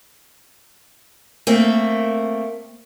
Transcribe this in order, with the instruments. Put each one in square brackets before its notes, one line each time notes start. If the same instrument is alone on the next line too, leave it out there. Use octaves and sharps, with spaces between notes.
[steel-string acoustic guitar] A3 A#3 C4